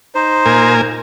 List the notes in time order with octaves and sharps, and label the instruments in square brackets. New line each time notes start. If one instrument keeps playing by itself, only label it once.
[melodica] D#4 C5
[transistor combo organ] A#2 A#4 G#5